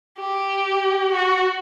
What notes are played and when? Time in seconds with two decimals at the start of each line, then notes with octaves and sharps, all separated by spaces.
0.20 G4
1.12 F#4